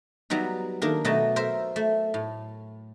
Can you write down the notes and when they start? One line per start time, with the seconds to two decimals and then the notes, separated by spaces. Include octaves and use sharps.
0.30 F#3 G3 B3 D#4
0.82 D#3 A#3 D4 A#4
1.05 B2 F#3 A3 D#5 A5
1.36 A#4 C5 E5
1.76 A3
2.14 A2